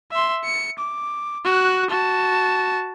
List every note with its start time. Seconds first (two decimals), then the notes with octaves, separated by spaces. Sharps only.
0.12 E5 C6
0.44 C#7
0.78 D6
1.45 F#4 F#6
1.90 F#4 A5